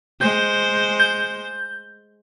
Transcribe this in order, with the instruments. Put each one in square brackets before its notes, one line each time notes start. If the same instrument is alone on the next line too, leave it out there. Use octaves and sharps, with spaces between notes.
[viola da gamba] G#3 C5 [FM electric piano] G6
[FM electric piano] G6